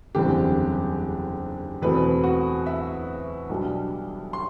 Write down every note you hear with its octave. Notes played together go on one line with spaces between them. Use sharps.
F#1 E2 D3 G3 C4 G4
E2 B2 A3 C4 B4
F#4
E5
B1 B2 G3 D4
C6